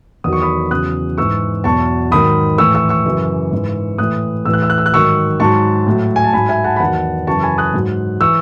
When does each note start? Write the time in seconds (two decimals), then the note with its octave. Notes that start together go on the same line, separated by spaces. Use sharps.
0.24 E2 D#3 F#3 D#6
0.33 C#6
0.42 B5 D#6
0.71 E2 C#3 F#3 D#6 F#6
1.18 G#2 E3 C#6 E6
1.64 E2 B2 F#3 A5 C#6
2.11 G#2 D#3 F#3 B5 D#6
2.58 A2 E3 C#6 E6
2.75 C#6 E6
2.89 C#6 E6
3.06 F#2 C#3 E3
3.52 G#2 E3
3.98 A2 E3 D#6 F#6
4.45 A2 E3 E6
4.53 F#6
4.62 E6
4.70 F#6
4.78 E6
4.86 F#6
4.92 G#2 D#3 F#3 C#6 E6
5.40 G#2 F#3 A5 C#6
5.87 A2 F#3
6.16 G#5
6.24 A5
6.33 G#2 F#3 G#5 B5
6.49 E5 G#5
6.64 F#5 A5
6.76 B5
6.80 E2 D#3 F#3 F#5 A5
7.27 F#2 C#3 E3 A5 C#6
7.42 G#5 B5
7.58 D#6 F#6
7.74 G#2 F#3
8.21 E3 C#6 E6